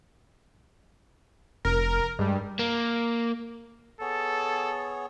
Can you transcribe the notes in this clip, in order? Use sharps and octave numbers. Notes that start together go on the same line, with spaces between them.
F1 A#4
G2 G3 G#3
A#3
B3 G#4 A4 C#5